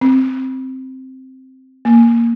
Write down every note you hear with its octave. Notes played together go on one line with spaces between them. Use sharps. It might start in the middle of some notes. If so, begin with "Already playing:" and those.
C4
A#3